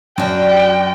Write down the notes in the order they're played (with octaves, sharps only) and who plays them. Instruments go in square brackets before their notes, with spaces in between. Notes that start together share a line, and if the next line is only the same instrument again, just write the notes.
[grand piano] F#2 [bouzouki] D4 F#4 [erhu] G5